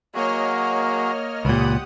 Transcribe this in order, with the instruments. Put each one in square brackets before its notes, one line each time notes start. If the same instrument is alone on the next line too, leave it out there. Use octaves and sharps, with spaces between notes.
[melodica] F#3 F#4 G#4 [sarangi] A#3 [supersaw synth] C#5 D#5 F6
[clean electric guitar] C#2 A#2 [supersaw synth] G4 F#5 D#6 [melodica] B5